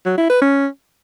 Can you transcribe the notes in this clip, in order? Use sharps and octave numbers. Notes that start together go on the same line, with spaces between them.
F#3
E4
B4
C#4